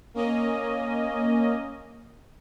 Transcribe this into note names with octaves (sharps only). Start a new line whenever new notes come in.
A#3 C#4 D#5